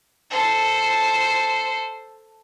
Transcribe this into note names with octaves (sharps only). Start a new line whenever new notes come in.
A4 C5